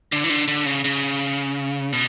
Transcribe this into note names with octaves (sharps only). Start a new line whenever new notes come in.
D3
E3
D3
D3
C#3
C#3
B2